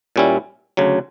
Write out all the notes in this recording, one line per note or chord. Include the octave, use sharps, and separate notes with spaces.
A#2 G3 C#4 E4
D2 C#3 F#3